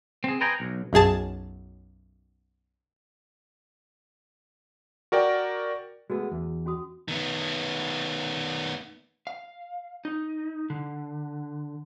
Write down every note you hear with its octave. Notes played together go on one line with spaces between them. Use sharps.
C4 G#4
B4 C5 D#5 G5 G#5 A#5
B1
B1 F#2 G#4 A5
F#4 A#4 D5 G5
G#3 A3 B3 F#4
E2
C#4 F#4 D#6
D#3 B3
F5
D#4
D3